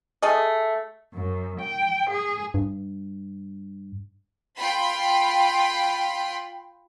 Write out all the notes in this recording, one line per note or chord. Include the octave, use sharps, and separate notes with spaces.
A3 G#4 D#5
F#2
G5
G#4
G2
F4 G5 B5 C6